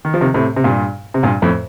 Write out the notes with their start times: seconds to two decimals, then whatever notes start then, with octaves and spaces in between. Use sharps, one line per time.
0.05 D#3
0.14 F3
0.21 C3 D#3
0.34 A2 C3
0.56 C3
0.64 G2 A#2
1.14 C3
1.23 G2 A#2
1.42 F2 A2